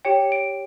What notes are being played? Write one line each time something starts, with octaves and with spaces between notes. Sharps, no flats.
G4 C#5 G5 C#7
D7